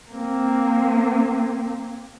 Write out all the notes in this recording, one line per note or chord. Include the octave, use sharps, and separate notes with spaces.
A#3 C4